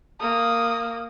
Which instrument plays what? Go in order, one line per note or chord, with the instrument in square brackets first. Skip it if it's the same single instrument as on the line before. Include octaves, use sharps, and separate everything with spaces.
[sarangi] A#3 [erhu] D#6